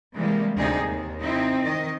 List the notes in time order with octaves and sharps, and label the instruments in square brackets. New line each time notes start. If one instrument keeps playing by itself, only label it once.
[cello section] C3 E3 G3 G#3 A#3
D2 C3 D#4 G#4 D5
D#2
C3 C4 D#4 E4
D#3 D#5